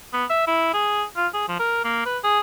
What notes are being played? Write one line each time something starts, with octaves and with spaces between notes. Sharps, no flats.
B3
E5
E4
G#4
F4
G#4
F3
A#4
A#3
B4
G#4